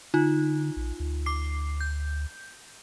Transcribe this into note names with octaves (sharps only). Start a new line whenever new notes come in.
D3 D#4 F4
A#1
D2
D6 C7
G6